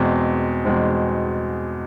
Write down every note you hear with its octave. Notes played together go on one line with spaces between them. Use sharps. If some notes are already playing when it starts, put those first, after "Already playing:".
Already playing: E2 B2 G#3 C4
E2 B2 G#3 C4